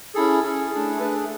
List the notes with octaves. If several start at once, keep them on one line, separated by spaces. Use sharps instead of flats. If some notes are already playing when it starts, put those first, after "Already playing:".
C#4 E4 G#4 A4
C#4 E4 G#4
A3 D4 G#4
A3 D4 G#4 B4